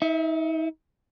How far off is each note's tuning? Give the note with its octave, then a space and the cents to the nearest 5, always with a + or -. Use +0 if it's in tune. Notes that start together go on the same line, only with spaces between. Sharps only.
D#4 +40 E5 +0